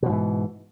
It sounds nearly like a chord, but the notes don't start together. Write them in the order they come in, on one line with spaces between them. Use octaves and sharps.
B2 F3 G#2 E3